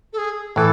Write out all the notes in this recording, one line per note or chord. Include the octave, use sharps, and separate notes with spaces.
A4
G#4
A2 E3 A4